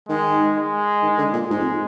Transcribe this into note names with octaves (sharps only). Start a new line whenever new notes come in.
D#3 G#3
G#3
D#3
D3
A#2
G#2 G#3
F2